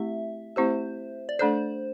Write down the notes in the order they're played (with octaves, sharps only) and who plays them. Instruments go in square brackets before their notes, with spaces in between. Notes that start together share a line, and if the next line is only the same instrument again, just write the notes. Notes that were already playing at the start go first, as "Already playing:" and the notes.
Already playing: [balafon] A3 C4 E4 G4 [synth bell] E5
[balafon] A3 C4 E4 G4 [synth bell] C5
[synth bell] D5
[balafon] A3 D4 A4 D5 [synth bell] C5